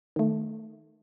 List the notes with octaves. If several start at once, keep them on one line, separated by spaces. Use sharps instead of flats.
D#3 A3